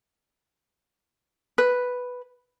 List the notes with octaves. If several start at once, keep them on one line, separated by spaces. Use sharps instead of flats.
B4